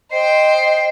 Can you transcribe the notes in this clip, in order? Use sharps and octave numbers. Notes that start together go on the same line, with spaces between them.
C5 D#5 G5 C7